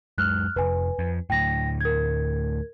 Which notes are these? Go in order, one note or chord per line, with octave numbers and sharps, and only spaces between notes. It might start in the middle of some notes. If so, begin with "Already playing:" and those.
F#2 G#3 F6 F#6
F1 B4 G#5
F2
D2 A2 G5 A#6
A#4 G#6